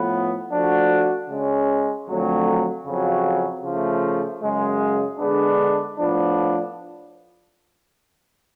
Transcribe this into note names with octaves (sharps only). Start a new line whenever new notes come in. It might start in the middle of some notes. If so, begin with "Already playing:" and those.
Already playing: A2 F3 B3
F3 A3 D4 F#4
C#3 G#3 C#4
F2 D3 F#3 A3
F2 C#3 F#3
C#3 F3 A3
F#2 C#3 G#3
D3 G#3 B3 D4
A2 F3 B3 D4